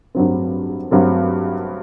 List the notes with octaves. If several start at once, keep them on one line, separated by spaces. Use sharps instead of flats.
G2 F#3 C4
G2 F#3 C4